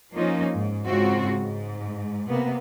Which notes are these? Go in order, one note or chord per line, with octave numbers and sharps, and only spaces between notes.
F3 A#3 C#4 D#4 F4
G#2
G#2 C#3 C4 F4 F#4
G#2
C3 A#3 B3